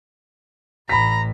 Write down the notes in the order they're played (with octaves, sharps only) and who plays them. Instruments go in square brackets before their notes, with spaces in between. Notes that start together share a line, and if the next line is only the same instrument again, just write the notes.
[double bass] A1 A2 [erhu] A#5 [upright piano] B5 B6